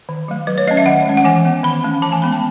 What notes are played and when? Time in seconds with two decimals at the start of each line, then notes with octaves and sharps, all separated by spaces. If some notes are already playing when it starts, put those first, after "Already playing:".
0.09 D#3
0.28 F#3 A3
0.47 F#3 B4
0.58 C#5
0.68 A3 C#4 D#5
0.77 E5
0.86 D#3 F#5
1.06 G#3 C#4
1.17 F#5
1.24 E3 G#5
1.45 B3
1.63 D#3 B5
1.84 A3 C#4
2.02 E3 A5
2.12 G#5
2.22 G#3 B3 B5
2.32 A5